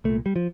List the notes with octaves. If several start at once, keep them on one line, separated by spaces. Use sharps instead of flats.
C2 A#2 A3
G3
F3